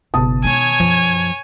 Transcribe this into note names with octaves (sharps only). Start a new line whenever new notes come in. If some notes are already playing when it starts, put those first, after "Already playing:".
F#1 B2 A5 D#6
D#3 G#3 C#5 G#5
F#2 F3